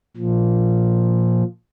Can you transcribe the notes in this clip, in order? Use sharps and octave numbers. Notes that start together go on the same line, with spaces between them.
A#2 F3